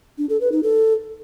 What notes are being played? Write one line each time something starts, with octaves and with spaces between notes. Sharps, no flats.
D4
A4
B4
D#4
A4